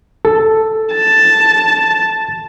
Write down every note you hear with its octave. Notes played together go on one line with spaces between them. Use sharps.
A4
A5